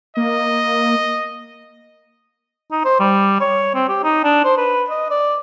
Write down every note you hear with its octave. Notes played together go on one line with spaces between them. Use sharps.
A#3 D#5
D#4
C5
G3
C#5
C4
G4
D#4
D4
C5
B4
D#5
D5